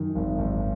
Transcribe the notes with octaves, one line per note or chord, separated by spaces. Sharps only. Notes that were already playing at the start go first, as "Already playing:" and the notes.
Already playing: F#2 D#3
G#1
G#1